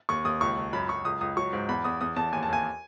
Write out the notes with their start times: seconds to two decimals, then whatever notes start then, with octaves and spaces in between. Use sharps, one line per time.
0.09 D#2 C#6
0.25 D#2 D#6
0.41 C#2 C#6
0.57 C#2
0.73 F#2 B5
0.89 F#2 C#6
1.05 C#2 D#6
1.21 C#2 D#6
1.37 F#3 C#6
1.53 G#2
1.69 E2 B5
1.84 E2 D#6
2.01 E2 D#6
2.16 E2 A5
2.32 D#2 G#5
2.43 A5
2.49 D#2 G#5